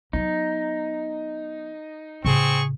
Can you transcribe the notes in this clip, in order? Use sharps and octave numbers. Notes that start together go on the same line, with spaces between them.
F#3 B3 D#4
A2 C#3 C4 G#4 C#6